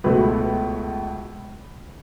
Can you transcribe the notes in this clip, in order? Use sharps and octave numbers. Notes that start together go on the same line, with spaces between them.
C#2 B2 A3 B4